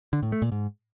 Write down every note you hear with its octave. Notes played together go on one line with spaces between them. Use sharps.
D3
A2
A3
A#2
G#2